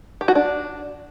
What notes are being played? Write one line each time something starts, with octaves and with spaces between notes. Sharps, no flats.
G4
F#4
D4